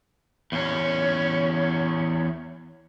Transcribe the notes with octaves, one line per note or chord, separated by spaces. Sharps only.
E2 C#4